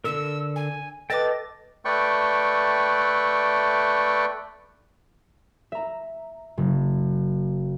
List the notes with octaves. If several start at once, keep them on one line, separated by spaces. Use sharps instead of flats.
D3 A4 A#4 E6
G#5
A4 B4 D#5 G5 D6 A6
A3 B4 D5 G5 C#6
E5 A#5
F#1